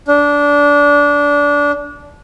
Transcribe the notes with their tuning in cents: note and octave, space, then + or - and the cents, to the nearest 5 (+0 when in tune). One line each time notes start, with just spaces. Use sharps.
D4 -20